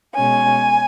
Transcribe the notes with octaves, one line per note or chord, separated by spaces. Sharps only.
B2 G#3 C#4 G#5